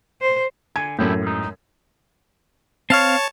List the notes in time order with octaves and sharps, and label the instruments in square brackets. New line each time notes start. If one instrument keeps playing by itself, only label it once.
[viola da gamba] C5
[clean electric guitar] D3 G#5 [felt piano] G#6
[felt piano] F#2 A2 [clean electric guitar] D4 E4 G4
[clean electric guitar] G#2 D#4
[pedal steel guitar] C4 F5 F6 [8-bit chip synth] C#5 A5